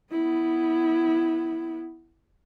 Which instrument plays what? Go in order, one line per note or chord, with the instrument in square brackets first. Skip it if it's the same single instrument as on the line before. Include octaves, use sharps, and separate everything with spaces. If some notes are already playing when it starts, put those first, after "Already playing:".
[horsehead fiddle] B3 E4